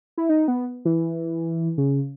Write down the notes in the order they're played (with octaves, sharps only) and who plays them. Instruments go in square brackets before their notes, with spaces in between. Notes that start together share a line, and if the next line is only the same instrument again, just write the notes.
[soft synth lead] E4
D#4
B3
E3
C#3